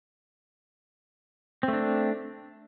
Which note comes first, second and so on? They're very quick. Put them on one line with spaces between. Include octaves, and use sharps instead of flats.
C4 A3 D4